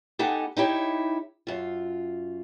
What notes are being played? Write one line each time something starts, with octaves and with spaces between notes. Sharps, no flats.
B3 D#4 G4 A4 F#5 G#5
D#4 E4 G4 C#5
F#2 F4